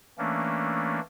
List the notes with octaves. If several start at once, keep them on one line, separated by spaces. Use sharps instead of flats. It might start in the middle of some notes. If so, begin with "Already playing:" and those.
E3 A3 A#3 C#4 D4